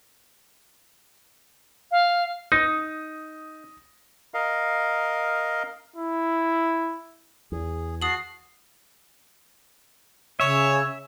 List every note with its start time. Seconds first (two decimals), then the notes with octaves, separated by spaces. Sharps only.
1.91 F5
2.52 D#4 D#6 A#6
4.34 A#4 D#5 F5
5.96 E4
7.52 E2 G#4
8.02 F#4 A5 D#6 C7 F#7
10.40 C#3 C#5 E5